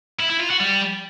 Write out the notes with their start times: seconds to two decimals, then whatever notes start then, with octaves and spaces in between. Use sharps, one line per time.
0.20 E4
0.30 E4
0.40 F4
0.50 F#4
0.60 G3